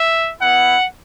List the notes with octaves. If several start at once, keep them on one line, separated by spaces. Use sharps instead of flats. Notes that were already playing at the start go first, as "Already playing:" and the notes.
Already playing: E5
B3 E4 F#5